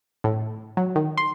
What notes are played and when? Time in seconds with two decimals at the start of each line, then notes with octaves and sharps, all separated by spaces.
0.24 A2
0.77 F#3
0.96 D#3
1.18 C6